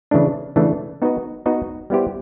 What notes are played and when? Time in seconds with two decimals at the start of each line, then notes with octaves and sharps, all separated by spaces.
0.11 C#3 E3 A3 D4
0.56 C#3 E3 A3 D4
1.02 B3 D#4 F#4 B4 D#5
1.46 B3 D#4 F#4 B4 D#5
1.90 G3 B3 E4 G4 C5